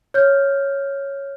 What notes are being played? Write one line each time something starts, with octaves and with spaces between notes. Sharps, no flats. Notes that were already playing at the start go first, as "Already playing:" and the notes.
C#5 F6 G6